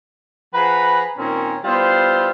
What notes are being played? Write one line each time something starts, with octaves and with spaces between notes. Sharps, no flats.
F3 G#4 B4 F#5 A#5 B5
A#2 D#3 C4 C#4
G3 B3 E4 F4 C5